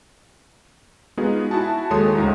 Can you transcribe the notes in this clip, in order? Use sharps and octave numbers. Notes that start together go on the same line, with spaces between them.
G#3 B3 D#4 F4 F#4 G#4
E4 F#4 G#5 A5
D#2 G#3 A4 C#5 C6 D#6
G#1 D2 G#3 E4 A#5